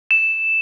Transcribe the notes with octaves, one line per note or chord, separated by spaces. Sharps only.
E7